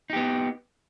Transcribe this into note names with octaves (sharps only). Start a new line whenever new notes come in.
B3 D#4 G4